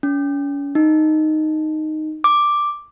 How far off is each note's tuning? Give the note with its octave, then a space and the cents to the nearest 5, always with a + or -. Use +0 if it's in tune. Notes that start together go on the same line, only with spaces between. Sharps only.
C#4 +35
D#4 -5
D6 +0